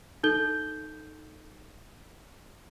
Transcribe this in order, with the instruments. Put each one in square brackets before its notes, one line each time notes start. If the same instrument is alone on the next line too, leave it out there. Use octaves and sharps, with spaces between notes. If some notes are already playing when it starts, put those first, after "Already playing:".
[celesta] D#4 A4 G6 G7